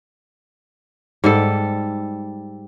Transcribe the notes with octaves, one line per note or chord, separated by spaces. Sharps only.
G#2 G3 A4